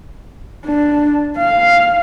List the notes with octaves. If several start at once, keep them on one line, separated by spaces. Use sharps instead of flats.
D4
F5